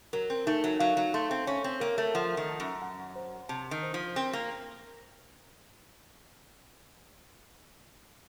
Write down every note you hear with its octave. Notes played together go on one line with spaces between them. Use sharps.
F#3 A#4
C4
A3 D#4
F#3
F#3 F5
F#3
A3 C6
C4
C#4 C#5
C4
A#3 A#4
A3
F3 F#5
D#3
A5
F#2
F#5
C5
C3 A5
D#3
C5
F3
C4 A#4
A#3